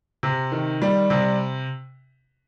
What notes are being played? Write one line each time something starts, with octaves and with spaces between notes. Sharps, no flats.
C3
D#3
G3
C3